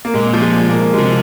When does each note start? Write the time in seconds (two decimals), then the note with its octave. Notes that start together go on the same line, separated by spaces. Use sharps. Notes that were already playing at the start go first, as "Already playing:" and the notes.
0.05 A#3
0.14 A#2 G#3
0.33 F3
0.42 G#3
0.70 A#3
0.94 G#3
0.98 C3 F3